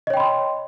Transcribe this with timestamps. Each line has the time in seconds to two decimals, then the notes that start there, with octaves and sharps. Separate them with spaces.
0.07 D#5
0.10 C#5
0.14 G5
0.17 B5
0.20 C6